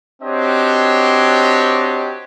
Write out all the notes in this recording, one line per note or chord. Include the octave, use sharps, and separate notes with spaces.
C4 D4 F#4 G4 C#5 D#5